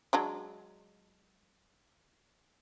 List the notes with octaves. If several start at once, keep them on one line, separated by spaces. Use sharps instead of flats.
F#3 G#3 D4